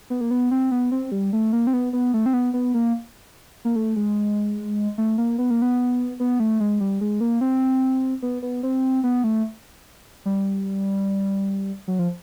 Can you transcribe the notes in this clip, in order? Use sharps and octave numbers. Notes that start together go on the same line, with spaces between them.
B3
A#3
B3
C4
B3
C4
G3
A3
A#3
C4
B3
B3
A3
C4
B3
B3
A#3
A#3
A3
G#3
A3
A#3
B3
A#3
B3
B3
A3
G#3
G3
G#3
A#3
C4
B3
B3
C4
B3
A3
G3
F#3
F3